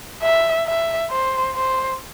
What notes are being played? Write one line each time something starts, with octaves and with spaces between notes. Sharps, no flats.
E5
E5
C5
C5